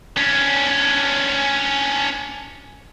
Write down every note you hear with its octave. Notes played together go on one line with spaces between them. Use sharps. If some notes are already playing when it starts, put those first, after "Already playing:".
C#4 D4